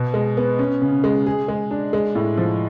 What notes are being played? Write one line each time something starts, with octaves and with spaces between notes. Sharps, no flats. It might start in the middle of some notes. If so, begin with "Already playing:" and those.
Already playing: B2
G#3
B3
C#4
C#3
G#3
G#4
G#3
D4
G#3
A2
F3